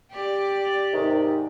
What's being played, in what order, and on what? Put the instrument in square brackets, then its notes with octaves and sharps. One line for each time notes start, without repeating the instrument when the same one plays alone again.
[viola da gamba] G4 D5
[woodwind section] G#2 C3 D#3